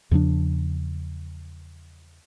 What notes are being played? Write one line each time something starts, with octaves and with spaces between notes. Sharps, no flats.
E2 C#3 F3 D4